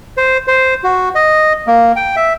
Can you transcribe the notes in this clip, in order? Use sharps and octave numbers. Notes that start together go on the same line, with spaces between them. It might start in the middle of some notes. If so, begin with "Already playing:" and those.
C5
C5
F#4
D#5
A#3
G5
E5